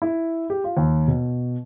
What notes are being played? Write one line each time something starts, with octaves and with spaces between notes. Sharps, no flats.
E4
G4
F4
D#2
B2